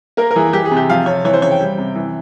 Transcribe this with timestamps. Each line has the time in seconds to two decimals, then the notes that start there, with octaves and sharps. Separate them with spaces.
0.17 A#3 A#4
0.31 A#4
0.36 E3 G#4
0.53 E3 G4
0.65 G#4
0.71 C3
0.76 G4
0.90 F3 F5
1.06 C3 C#5
1.25 E3 C#5
1.33 C5
1.42 C#3 C#5
1.51 G5
1.60 G3
1.78 C3
1.95 E3